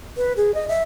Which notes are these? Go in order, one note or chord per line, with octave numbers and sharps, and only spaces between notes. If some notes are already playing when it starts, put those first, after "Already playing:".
B4
G#4
D#5
E5